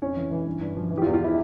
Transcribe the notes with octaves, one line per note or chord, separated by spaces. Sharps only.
F2 C#4 C#5
E3
E3
G2
G2
F3
E3
G4
F4
E2
F4
E4